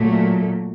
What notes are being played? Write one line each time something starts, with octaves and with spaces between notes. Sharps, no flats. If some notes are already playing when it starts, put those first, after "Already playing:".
Already playing: A#2 F#3 A3